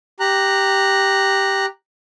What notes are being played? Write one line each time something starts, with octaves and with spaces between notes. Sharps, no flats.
G4 A#5 F#6